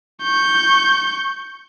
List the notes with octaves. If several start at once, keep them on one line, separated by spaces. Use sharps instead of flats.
C#6 G6